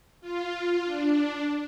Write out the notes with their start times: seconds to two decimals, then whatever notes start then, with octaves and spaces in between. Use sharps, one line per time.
0.21 F4
0.85 D4